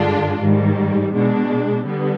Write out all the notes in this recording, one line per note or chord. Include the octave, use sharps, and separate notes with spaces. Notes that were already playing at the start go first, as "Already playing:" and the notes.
Already playing: G2 D3 G#3 D4 F4
G#2 D#3 G3
B2 G#3 D4
D3 G3 B3